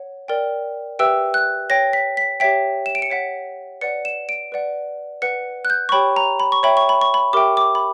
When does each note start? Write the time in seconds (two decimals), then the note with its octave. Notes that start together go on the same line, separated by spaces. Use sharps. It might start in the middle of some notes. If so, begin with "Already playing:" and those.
Already playing: C#5 F#5
0.28 A#4 D5 G5
0.99 G4 B4 E5 G5 E6
1.34 F#6
1.70 C#5 G5 A#6
1.93 B6
2.17 B6
2.40 G4 C#5 E5 G5 B6
2.86 E7
2.95 D7
3.02 C#7
3.10 C#5 F#5 B6
3.81 B4 D5 F#5 C#7
4.05 E7
4.29 D7
4.52 B4 D5 F#5
5.22 B4 F#5 C#7
5.65 F#6
5.70 G6
5.89 C#6
5.92 G4 C#5 G5 B5
6.16 A#5
6.40 B5
6.52 C#6
6.63 C#5 E5 G5 B5
6.77 C#6
6.89 B5
7.01 C#6
7.14 B5
7.33 G4 A#4 E5 G5 D6
7.57 D6
7.75 B5